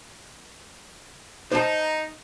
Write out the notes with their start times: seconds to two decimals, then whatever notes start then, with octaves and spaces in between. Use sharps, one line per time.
1.52 D#4 C5 A5